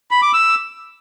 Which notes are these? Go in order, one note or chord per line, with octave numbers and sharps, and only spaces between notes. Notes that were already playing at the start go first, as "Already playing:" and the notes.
B5
D6
E6